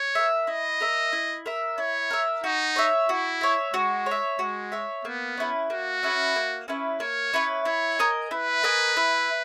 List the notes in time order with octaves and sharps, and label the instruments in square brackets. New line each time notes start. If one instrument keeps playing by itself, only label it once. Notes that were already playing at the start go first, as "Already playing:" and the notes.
Already playing: [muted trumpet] C#5
[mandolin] A#4 E5
[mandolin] E4 [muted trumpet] D#5
[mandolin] A#4 E5
E4
A#4 E5
[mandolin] E4 [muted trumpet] C#5
[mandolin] A#4 E5
[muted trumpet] D#4 [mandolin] F#4
[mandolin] C#5 E5
[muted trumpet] E4 [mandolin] F#4
[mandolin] C#5 E5
[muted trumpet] G#3 [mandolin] F#4
[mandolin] C#5
E5
[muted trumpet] G#3 [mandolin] F#4
[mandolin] C#5 E5
[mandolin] A#3 [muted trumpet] B3
[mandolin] C#4 E4 B4
[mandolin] A#3 [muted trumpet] F#4
[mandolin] C#4 E4 B4
A#3
C#4 E4 B4
[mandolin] A#3 [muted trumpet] C#5
[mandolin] C#4 E4 B4
[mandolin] E4 [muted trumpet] C#5
[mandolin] A#4 D#5 G#5
[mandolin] E4 [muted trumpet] B4
[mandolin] A#4 D#5 G#5
E4